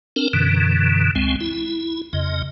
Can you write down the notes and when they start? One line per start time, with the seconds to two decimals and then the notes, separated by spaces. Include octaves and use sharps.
0.16 C4 D4 A#4
0.33 F#2 B2 D3 E3
1.15 C#2 G#3 C4
1.41 E4
2.13 F2 C#3 D#5